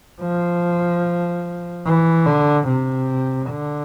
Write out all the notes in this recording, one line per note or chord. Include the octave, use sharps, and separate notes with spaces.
F3
E3
D3
C3
D3